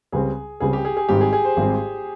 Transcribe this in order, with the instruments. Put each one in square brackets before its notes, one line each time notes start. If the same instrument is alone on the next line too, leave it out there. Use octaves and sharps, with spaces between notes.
[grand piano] C#2 C#3 G3 C4 [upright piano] G#4
[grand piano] C#2 C#3 G3 C4 [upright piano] G#4
[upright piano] G4
G#4
G#4
[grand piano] G#1 G#2 G3 C4 [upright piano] G4
[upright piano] G#4
G#4
C5
[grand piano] G#1 G#2 G3 C4